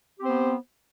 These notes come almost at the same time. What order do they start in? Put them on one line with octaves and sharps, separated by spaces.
G4 C4 C5 B3